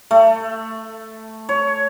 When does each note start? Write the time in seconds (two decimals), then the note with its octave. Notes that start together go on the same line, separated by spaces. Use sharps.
0.11 A3
1.49 C#5